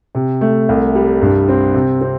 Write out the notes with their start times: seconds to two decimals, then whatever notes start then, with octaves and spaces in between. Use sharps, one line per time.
0.15 C3
0.41 A3
0.69 C2
0.95 G3
1.22 G2
1.48 C4
1.75 C3
2.01 C4